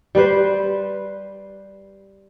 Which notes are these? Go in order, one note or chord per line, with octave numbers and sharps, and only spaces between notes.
G3 G4 B4 C5